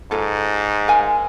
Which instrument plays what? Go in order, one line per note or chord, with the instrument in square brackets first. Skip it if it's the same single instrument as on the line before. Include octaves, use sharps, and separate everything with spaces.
[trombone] G#2 [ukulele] F4 A4
[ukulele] A#4 F5 G#5